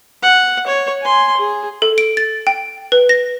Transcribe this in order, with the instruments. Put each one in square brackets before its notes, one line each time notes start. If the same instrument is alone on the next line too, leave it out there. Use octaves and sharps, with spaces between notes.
[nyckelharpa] F#5
C#5
G#5 C6
G#4
[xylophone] A4
D7
A6
G5
B4
A#6